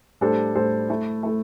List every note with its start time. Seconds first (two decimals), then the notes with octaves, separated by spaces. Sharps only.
0.21 A2 G3 D4 A4 C5
0.55 A2 G3 D4 A4 C5
0.90 A3 E4 A4
1.23 A3 E4 A4